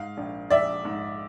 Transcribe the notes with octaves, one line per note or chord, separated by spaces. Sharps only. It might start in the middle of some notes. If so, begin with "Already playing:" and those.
Already playing: G#2 F5
A#1
A#1 D5 E5
G#2